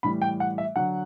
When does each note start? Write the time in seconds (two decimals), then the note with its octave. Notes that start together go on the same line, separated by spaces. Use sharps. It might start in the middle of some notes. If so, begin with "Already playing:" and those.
0.03 A2 E3 G3 B5
0.22 G5
0.40 F#5
0.58 E5
0.76 D3 F#3 F#5